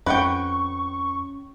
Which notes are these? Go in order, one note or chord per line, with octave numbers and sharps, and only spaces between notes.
F2 C#4 B4 F#5 G5 C#6